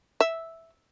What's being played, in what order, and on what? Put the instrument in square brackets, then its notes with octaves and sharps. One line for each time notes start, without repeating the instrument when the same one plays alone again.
[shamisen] E5